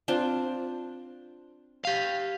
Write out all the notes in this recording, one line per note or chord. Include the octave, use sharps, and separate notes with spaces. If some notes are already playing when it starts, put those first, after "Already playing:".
C4 D4 F4
G4 F5